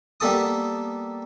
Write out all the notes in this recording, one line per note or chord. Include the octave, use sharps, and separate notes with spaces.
G3 A#3 B3 A4 A5 D#6